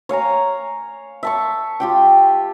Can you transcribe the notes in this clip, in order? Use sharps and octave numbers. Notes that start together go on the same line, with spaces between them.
C#5 F5 G#5 A#5
E5 A5 C#6
F4 G4 G5